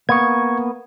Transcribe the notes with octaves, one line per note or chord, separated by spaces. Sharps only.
A#3 B3 C#6 G#6